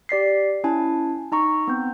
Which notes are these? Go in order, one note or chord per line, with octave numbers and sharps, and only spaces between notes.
G4 D5 B6 C7
C#4 E4 G#5 A5
D#4 A#5 C#6
B3 C4 G6